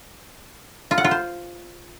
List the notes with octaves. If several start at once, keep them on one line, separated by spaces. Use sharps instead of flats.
F4
F#5
F4
C5